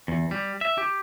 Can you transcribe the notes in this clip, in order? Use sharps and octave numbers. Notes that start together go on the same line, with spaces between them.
E2
G3
E5
G4